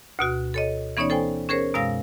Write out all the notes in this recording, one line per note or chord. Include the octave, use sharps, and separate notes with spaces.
D2 B2 F#4
A4 C#5 D#5
E3 B3 C#4 D#4 C#5 D5
A4 C5 G5 G#5
C#4 G#4 A#4 C5 C#5
F#2 B2 G#3 F5 E6 A#6